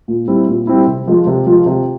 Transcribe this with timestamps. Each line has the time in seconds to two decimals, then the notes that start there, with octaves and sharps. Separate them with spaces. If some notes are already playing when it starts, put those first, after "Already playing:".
0.08 A#2
0.28 G3 C4 E4
0.48 A#2
0.67 G3 C4 E4
0.87 C3
1.07 F3 G#3
1.27 C3
1.47 F3 G#3
1.66 C3